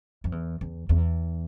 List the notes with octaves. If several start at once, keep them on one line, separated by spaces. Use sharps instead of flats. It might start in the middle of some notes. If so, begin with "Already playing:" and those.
F2
E2
E2
E2